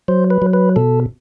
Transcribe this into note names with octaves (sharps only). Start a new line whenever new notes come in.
F#3 C5
B4
F#3
B4
B2 A4